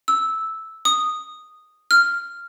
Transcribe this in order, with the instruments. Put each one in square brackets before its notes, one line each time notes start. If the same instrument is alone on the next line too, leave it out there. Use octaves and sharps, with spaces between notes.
[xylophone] E6
D#6
F6